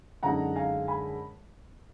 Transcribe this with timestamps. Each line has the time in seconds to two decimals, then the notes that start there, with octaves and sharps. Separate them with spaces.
0.23 F#2 D3 G#3 D#4 F#5 A#5
0.56 F5 G#5
0.88 G#5 B5